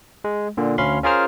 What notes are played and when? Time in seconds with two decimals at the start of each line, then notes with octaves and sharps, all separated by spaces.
0.24 G#3
0.57 A#2 D3
0.78 D2 C#4 F5 B5 C6
1.03 C#4 F4 G#4 A#4 C5 F6